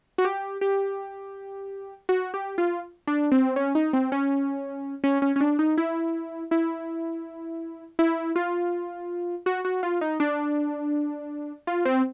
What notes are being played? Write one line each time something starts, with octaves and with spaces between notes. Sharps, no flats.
F#4
G4
G4
F#4
G4
F4
D4
C4
C#4
D#4
C4
C#4
C#4
C#4
C#4
D4
D#4
E4
E4
E4
F4
F#4
F#4
F4
D#4
D4
F4
C4